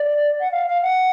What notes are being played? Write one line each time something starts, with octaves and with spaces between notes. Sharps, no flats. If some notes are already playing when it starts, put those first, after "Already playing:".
Already playing: D5
F#5
F5
F5
F#5